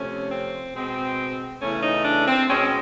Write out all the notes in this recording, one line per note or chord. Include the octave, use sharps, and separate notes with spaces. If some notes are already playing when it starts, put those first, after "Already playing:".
Already playing: C3 F3 A3 C#4
C4
B2 G#3 C4
E2 C#3 E3 A3 C#4
D#4
D4
C4
B2 G#3 C4 C#4